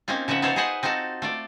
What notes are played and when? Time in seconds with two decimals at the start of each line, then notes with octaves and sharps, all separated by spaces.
0.08 A#3 C4 C#4 D#4 F4
0.28 C#3 F3 D#4 E5 F#5
0.42 B3 D#4 F4 A4 C5 C#5
0.56 G#4 B4 C5 D#5 F#5 G#5
0.83 C4 D#4 F4 F#4 A4
1.22 A3 F4 D5